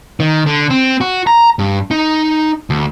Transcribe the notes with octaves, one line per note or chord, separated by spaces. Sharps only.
D#3
D3
C4
F#4
A#5
G2
D#4
D2